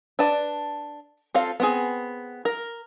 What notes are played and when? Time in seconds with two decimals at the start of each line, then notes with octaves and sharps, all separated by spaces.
0.19 D4 B4 D5 A5
1.34 C4 F4 A4 C5 F5
1.60 B3 C4 G#4
2.45 A#4